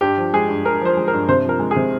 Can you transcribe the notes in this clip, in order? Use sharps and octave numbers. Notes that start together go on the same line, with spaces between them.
G2 G4
F3
G#3 G#4
G2
G2 A#4
F3 C5
G#3
A#4
G2
C3 C5
F3 A#4
G#3
G#4
C3